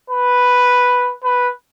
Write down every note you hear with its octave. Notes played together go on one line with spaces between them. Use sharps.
B4
B4